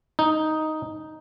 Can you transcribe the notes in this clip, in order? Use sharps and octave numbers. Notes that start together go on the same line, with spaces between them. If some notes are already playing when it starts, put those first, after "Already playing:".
D#4